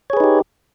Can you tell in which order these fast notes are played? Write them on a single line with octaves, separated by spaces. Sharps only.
C#5 G#4 B4 D#4 G4